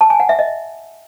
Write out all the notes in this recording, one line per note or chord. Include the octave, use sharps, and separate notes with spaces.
A5
G#5
F#5
E5
D#5